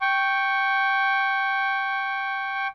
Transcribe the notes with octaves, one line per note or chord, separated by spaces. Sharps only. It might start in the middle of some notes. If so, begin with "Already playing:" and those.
G5 C#6